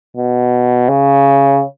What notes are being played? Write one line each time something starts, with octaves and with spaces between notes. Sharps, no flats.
B2
C#3